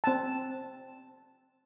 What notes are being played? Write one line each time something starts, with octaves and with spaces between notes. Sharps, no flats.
C4 A5